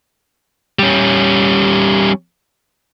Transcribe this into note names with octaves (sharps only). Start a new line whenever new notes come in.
G3 C#4